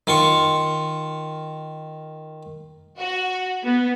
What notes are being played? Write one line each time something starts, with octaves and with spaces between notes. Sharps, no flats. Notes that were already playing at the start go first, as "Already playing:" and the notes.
D#3 F4 C#6
F#4
B3